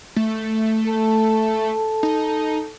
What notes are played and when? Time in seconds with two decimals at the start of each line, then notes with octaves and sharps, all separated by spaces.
0.16 A3
0.88 A4
2.03 D#4